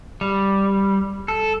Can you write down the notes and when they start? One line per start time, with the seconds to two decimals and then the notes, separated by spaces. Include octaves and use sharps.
0.21 G3
1.28 A4